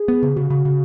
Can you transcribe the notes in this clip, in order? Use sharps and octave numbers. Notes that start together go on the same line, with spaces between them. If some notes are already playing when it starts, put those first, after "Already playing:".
Already playing: G#4
B3
C#3
C#3 F#4
C#3
C#3